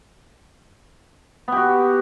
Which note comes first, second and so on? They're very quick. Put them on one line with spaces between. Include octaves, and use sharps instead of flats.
B3 G4 F#4